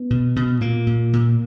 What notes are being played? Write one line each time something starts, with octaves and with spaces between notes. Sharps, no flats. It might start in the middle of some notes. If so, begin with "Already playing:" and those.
Already playing: B3
B2
B2
A#2 A#3
A#2
A#2